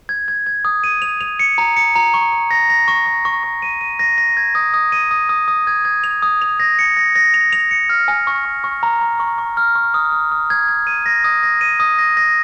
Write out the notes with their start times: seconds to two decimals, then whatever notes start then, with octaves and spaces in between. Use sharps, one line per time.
0.09 G#6
0.28 G#6
0.46 G#6
0.65 D#6
0.84 D#7
1.02 F7
1.21 F7
1.39 C#7
1.58 A#5
1.76 C#7
1.95 A#5
2.14 C#6
2.33 C#6
2.51 A#6
2.70 A#6
2.88 C#6
3.06 C#6
3.25 C#6
3.43 C#6
3.62 D#7
3.81 D#7
3.99 A#6
4.18 A#6
4.37 G#6
4.55 D#6
4.74 D#6
4.92 D#7
5.11 D#6
5.29 D#6
5.48 D#6
5.67 G#6
5.85 G#6
6.04 F7
6.22 D#6
6.42 F7
6.60 A#6
6.79 C#7
6.97 A#6
7.16 A#6
7.34 F7
7.52 F7
7.71 C#7
7.89 F6
8.08 G#5
8.27 C#6
8.45 C#6
8.64 C#6
8.83 A#5
9.01 A#5
9.20 C#6
9.38 C#6
9.57 F6
9.75 C#6
9.94 D#6
10.12 D#6
10.32 D#6
10.50 G#6
10.68 G#6
10.87 D#7
11.06 A#6
11.24 D#6
11.43 A#6
11.61 D#7
11.80 D#6
11.99 A#6
12.17 A#6